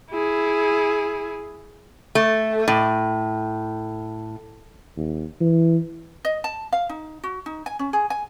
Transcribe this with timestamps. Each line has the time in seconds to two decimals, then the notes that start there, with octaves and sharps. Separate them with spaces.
0.11 E4 G#4
2.15 A3
2.68 A2
4.97 D#2
5.40 E3
6.25 D#5
6.44 A5
6.73 F5
6.89 D#4
7.24 F#4
7.46 D#4
7.66 G#5
7.79 C#4
7.93 G#4
8.10 G#5